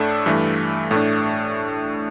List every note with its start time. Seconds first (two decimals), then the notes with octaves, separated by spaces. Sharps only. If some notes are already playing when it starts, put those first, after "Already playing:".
Already playing: A2 A3 D4 A4
0.26 G2 E3 A3
0.91 A2 A3 D4